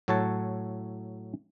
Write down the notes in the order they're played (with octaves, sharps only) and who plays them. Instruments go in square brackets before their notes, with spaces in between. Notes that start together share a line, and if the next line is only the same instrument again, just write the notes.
[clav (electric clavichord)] A2 F#3 A4 C#5 F#5 A5